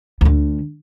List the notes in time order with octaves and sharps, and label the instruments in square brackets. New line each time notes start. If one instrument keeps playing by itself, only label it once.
[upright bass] D2 D3